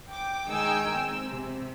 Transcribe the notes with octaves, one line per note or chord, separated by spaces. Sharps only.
G5 D6
D#3 G#3 D#4 G5 G#5 E6
C4 E6
C3